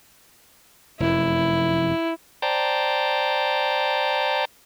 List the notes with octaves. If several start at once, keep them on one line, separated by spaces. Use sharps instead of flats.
F1 F#2 E4
C5 D5 G5 A5 A#5